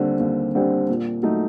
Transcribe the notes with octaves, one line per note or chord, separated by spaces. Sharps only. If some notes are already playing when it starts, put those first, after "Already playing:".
Already playing: D#2 D3 G3 C4
D#2
D3 G3 C4
A#2
F#3 A3 D#4